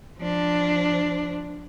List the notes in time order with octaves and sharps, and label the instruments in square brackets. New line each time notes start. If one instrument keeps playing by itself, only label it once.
[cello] F3 D4